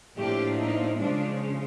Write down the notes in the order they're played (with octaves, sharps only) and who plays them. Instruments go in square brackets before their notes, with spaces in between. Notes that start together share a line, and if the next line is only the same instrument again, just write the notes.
[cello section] A2 F3 A#3 D4 G4
D#4
C#3 F3 G#3 D4